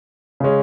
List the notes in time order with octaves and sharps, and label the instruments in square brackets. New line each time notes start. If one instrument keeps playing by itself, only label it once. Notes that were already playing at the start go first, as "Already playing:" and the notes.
[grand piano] C#3 G#3 C#4